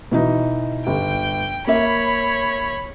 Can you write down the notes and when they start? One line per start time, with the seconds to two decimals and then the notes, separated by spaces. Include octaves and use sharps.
0.11 B2 E3 D#4
0.87 G1 G5
1.67 A#3 C#5 E5 B5